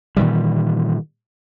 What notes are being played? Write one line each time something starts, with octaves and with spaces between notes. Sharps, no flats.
A#2 D#3 E3 G3